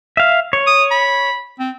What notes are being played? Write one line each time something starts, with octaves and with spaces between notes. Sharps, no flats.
E5 F5
C#5
D#6
B5
C4